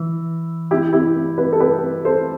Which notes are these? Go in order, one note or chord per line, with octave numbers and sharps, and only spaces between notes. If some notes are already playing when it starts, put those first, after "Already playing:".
Already playing: E3
E4 G4
E4 G4
G4 B4
A4
G4 B4
A4 C5